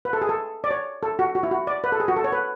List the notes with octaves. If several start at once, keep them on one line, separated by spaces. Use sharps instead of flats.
B4
A4
G#4
A4
D5
C#5
A4
F#4
F#4
E4
F#4
D5
B4
A4
G#4
F#4
A4
C#5
B4